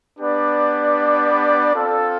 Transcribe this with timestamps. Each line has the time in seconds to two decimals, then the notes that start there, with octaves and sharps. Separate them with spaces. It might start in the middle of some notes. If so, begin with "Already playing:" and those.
0.19 B3 D4 G4 B4 D5
1.73 C4 F4 A4